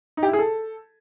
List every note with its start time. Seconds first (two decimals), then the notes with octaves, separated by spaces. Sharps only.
0.17 D#4
0.23 G4
0.28 E4
0.33 G#4
0.39 A4